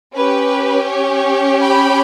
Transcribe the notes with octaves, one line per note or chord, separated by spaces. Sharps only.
C#4 G4 B4
C#5
G5 B5